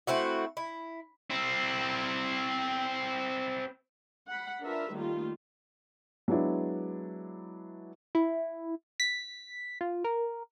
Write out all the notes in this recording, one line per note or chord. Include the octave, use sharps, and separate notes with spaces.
A3 C4 E4 F#4
E4
C4 E4
F#5 B5
D4 F4 A#4 B4 E5
D#3 G3 A3 A#3 F4
F#3 G#3 B3 D4 E4
E4
B6
F4
A#4